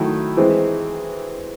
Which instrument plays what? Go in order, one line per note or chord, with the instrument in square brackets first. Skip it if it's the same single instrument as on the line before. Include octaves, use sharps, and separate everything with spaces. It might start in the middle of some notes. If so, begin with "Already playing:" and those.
Already playing: [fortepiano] D#3 F#3 A3 E4
E3 G#3 C4